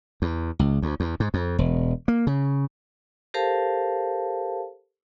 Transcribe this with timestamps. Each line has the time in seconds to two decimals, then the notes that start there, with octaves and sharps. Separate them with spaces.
0.22 E2
0.59 C#2
0.82 D2
1.00 E2
1.20 G#2
1.34 F2
1.58 E1
2.08 A#3
2.27 C#3
3.34 G4 A4 A#4 C5 F5 A5